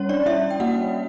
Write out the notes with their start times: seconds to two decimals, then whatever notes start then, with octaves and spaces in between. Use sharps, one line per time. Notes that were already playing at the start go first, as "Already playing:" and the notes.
Already playing: G3 C#4 C#5
0.09 D4 D5
0.26 G3 E4 E5
0.51 G5
0.60 A#3 F#4 F#5